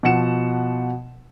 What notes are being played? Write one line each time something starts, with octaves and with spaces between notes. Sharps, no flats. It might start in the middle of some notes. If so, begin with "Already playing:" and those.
B2 F3 F#5 C#7 E7